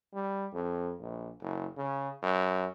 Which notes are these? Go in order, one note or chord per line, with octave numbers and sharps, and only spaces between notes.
G3
F2
A#1
F#1
C#3
F#2